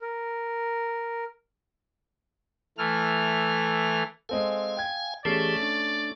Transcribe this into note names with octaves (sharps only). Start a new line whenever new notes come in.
A#4
E3 A3 F6
G#3 C4 A4 F5 G#5
G5 G#6
E3 A3 C#4 G4 G#4 D5 C7
D4